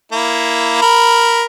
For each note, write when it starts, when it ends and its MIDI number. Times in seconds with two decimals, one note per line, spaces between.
0.12 0.81 58
0.12 0.81 64
0.82 1.43 70
0.82 1.43 83